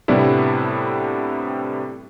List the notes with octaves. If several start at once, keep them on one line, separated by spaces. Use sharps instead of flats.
A2 C3 G3 B3 D4 E4